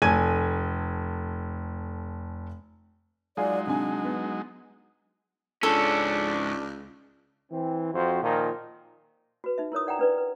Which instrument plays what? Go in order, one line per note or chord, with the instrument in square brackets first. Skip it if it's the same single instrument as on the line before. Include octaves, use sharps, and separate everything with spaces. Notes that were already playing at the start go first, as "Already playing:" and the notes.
[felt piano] F1 A4 G#5 G#6 D#7
[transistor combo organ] F#3 G#3 D#4 [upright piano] F4 G#4 [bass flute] D5
[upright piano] C3 G#5 [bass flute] D4
[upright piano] B3
[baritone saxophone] C#2 [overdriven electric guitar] G#2 C#4 [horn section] D4 [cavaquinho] A4
[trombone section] E3 C4
F2 F#4 C5
A#2 D#3 F3
[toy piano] F#4 B4
D#4 E5
E4 A#4 C#5 D#6
D5 F#5 G5 A#5
D4 B4 D5
B4